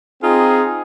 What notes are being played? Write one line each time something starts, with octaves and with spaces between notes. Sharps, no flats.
C4 D#4 F4 G#4